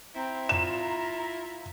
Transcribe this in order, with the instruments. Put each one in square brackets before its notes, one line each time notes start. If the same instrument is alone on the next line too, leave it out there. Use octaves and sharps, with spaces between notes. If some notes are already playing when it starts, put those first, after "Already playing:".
[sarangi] C4 [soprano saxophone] E4 [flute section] A#5
[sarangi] F4 [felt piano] E7